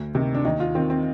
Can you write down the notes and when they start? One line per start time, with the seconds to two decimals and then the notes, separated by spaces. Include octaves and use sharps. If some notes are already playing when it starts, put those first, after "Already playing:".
Already playing: D2
0.15 C3 D#3
0.35 D4
0.45 D#2 D#4
0.60 F4
0.75 D#3 C4
0.90 C4